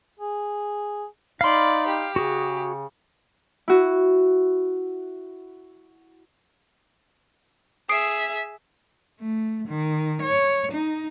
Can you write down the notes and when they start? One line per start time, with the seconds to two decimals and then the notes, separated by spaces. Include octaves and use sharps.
0.20 G#4
1.41 D#4 D5 F5 B5 C6
1.87 G4
2.16 C#3 F#4 G#4
3.68 E4 F#4
7.89 G#4 E5 D#6 C7 D7
9.20 A3
9.68 D#3
10.22 C#5
10.72 D#4